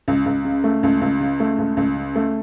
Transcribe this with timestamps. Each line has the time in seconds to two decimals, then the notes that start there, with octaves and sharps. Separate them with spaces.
0.08 C#2
0.26 C#2
0.45 C#3
0.64 A3
0.83 C#2
1.01 C#2
1.20 C#3
1.40 A3
1.59 C#2
1.77 C#2
1.96 C#3
2.15 A3